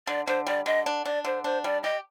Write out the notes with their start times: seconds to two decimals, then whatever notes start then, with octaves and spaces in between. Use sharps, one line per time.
0.07 D3 D5
0.27 D3 C5
0.47 G3 D5
0.66 D3 D#5
0.86 D4
1.05 D4 D5
1.25 D3 C5
1.44 D4 C5
1.64 G3 D5
1.83 G4 D#5